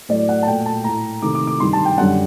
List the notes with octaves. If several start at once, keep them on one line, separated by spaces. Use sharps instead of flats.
A2 F#3 A3 D5
F#5
A5
A#2 A3 G5
A5
A2 A3 A#5
C3 D#3 A3 D6
D6
D6
G2 D#3 G3 C6
A5
G5
F#2 D3 G3 F#5